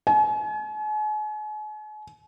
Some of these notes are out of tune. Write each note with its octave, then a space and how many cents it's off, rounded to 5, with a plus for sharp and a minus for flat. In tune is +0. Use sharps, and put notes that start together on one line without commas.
G#5 +40